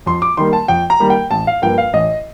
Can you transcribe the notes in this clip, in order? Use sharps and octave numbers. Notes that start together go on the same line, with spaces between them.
F2 C6
D6
D#3 G3 A#3 C6
A5
F2 G5
A#5
D#3 G3 A#3
G5
A1 A5
F5
G2 F3 A#3 G5
F5
A1 D#5